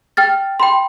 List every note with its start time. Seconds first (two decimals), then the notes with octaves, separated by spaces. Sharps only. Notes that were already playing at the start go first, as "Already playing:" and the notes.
0.17 G5 F6 A6
0.60 G5 B5 C6